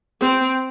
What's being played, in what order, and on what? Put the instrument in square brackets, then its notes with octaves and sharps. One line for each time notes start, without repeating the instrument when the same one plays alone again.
[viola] C4